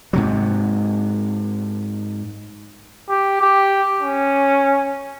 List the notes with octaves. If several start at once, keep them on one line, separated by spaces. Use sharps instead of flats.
G#2 C3 F#3
G4
G4
C#4